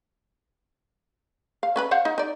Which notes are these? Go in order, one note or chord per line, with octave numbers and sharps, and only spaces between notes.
F5
C#4 B4 B5
C5 F5 F#5
D#4
D#4 D5